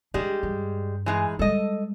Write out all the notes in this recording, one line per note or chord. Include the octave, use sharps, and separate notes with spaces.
G3 G#3 D4 G4
G2
E3 G#3 D#4
G3 G#3 A4 D#5